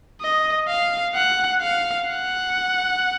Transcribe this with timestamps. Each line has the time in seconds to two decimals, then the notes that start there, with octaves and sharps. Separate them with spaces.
0.21 D#5
0.68 F5
1.15 F#5
1.61 F5
2.08 F#5